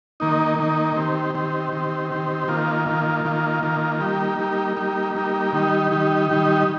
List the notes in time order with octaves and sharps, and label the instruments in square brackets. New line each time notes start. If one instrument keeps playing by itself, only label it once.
[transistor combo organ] D#3 A#3 D#4
D#3 A#3 D#4
D#3 C4 G4
D#3 C4 G4
D#3 C4 G4
D#3 C4 G4
D#3 A#3 F4
D#3 A#3 F4
D#3 A#3 F4
D#3 A#3 F4
G3 A#3 D#4 G4
G3 A#3 D#4 G4
G3 A#3 D#4 G4
G3 A#3 D#4 G4
D#3 G3 D#4 G4
D#3 G3 D#4 G4
D#3 G3 D#4 G4